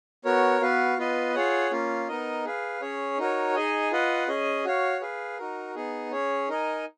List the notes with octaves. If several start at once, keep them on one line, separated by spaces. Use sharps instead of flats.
B3 F#4 A#4 C#5
B3 F#4 B4 F5
B3 F4 B4 D#5
F4 G#4 C#5 F#5
A#3 C#4 F4
B3 D#4 A#4 D#5
G#4 B4 F5
C#4 G#4 C#5
D#4 F#4 A#4 C#5
D#4 G#4 D#5 G#5
F4 B4 D#5 F#5
C#4 G#4 D#5 G#5
F#4 C#5 F5
G#4 B4 F5
D#4 F#4 A#4
B3 D#4 G#4
C#4 G#4 C#5
D#4 A#4 D#5 G#5